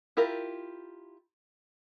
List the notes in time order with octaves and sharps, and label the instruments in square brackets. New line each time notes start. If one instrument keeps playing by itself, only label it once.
[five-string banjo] E4 F4 G4 A#4